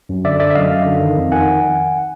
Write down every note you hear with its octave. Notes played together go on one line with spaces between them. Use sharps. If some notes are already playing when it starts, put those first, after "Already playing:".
F#2
D3 D5 E5
D3 D5 E5
E5
F#2 D#5 F5
F#2
D3
D#3
F2
D#3 F#5 G#5